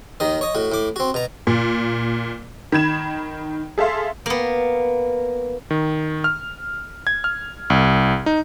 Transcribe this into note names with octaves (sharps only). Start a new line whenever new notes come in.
D#2 D#3 D#5
C#5 D#5
A2 F#4
A2 D6
C4 F#4
B2 A#5
A#2
D#3 B5 G#6 E7
G#4 A4 E5 F5 C6
A#3 B3
D#3
F6
G#6
F6
C2
D#4